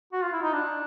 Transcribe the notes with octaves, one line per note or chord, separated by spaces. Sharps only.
F#4
F4
E4
D#4
D4